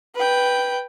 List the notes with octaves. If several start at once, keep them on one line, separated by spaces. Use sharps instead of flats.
B4 G5